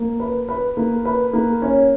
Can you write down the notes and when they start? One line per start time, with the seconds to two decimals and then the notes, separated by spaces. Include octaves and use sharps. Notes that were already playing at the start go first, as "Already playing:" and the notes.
Already playing: A#3
0.20 B4
0.48 B4
0.77 A#3
1.05 B4
1.33 A#3
1.62 C#4